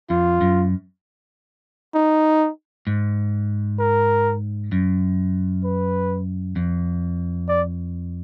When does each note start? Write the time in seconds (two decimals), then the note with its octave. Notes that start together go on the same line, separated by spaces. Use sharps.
0.10 F2 F4
0.41 F#2
1.95 D#4
2.87 G#2
3.79 A#4
4.72 F#2
5.64 B4
6.56 F2
7.48 D5